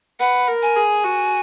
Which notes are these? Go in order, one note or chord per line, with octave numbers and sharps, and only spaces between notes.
B4 F#5
A#4
G#5
G#4
F#4